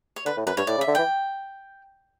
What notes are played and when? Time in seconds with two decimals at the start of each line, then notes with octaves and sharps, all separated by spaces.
0.16 C#5
0.26 D3 B4
0.37 A2
0.46 F#2 B4
0.57 G2 C#5
0.67 A2 D5
0.78 C#3
0.81 E5
0.88 D3
0.95 E3 G5